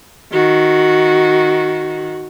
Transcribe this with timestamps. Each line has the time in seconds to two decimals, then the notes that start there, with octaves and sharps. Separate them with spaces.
0.33 D#3 F#4